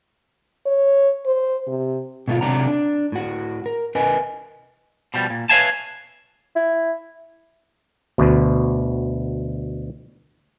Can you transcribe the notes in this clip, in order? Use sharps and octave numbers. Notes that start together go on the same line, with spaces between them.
C#5
C5
C3
B2 A3 F4
C3 F#3 A#3 D4 F#5 A#5
D4
A2 F#4
A#4
A#4 B4 D#5 G#5
B2 F3 G3
A#2
B4 C#5 E5 F5 G#5 A5
E4
D2 B2